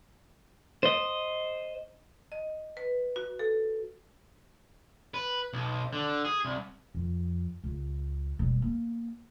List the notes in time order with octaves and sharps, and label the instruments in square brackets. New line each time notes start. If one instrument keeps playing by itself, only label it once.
[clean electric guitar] C5 D#5
[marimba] D#5
B4
F#4
A4
[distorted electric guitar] B4
B1
D3
G#4
C2
[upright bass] F2
C#2
E1 G3
A#3 B3